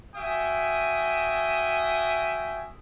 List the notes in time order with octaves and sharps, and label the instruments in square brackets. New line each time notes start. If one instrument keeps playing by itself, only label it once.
[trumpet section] F#4 E5 G5 G#5 D#6